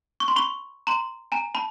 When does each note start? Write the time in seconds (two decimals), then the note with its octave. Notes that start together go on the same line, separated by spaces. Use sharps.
0.20 C#6
0.28 C6
0.36 B5 C#6
0.87 A#5 C6
1.32 G#5 A#5
1.55 A5 B5